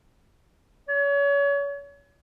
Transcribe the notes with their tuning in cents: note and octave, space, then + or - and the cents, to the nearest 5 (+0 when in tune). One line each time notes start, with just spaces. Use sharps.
C#5 +35